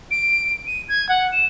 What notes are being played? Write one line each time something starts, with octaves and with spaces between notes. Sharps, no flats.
D7
D#7
G#6
F#5
E7